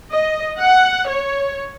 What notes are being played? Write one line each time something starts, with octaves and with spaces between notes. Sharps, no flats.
D#5
F#5
C#5